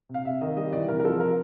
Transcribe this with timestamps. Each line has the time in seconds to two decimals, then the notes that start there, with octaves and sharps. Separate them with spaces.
0.09 C3
0.14 F5
0.25 C3 E5
0.41 D#3 D#5
0.57 G3 D#5
0.73 E3 D5
0.88 C3 A#4
1.00 A#4
1.04 F3 A4
1.20 A#4